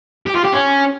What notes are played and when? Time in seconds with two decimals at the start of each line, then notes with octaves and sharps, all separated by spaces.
0.26 G4
0.35 F4
0.44 G4
0.53 C#4